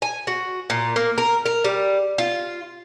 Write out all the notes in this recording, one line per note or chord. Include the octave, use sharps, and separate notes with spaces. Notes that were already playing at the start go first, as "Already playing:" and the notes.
G#5
F#4
A#2
A#3
A#4
A#4
G3
F4